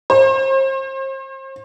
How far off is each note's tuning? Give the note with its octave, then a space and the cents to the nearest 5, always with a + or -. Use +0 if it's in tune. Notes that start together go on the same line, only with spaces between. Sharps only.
C5 +40